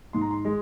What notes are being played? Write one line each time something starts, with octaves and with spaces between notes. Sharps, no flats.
G#2 C6
A#5
C6
G#3